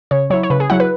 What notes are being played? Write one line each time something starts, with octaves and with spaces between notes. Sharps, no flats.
C#3 C#5
F#3 E4 C#5
C#5
C#3 B4
G#4
F#3 E4 F#5
B4